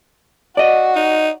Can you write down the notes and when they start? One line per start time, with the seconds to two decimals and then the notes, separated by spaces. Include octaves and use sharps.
0.57 F#4 D5 D#5
0.96 D#4